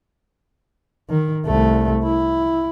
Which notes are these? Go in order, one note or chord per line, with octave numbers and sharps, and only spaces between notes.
D#3
C2 A3
E4